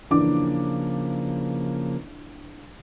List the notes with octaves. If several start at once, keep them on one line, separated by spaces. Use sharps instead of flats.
C#3 E3 F3 A#3 D4 D6